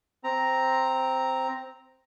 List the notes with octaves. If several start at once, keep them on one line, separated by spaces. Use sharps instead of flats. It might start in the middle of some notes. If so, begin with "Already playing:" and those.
C4 A#5